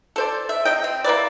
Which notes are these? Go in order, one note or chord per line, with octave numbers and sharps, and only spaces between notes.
A4 C5 D5
E5
C3 D#5 G5
C4
A#3 E4 B4 D5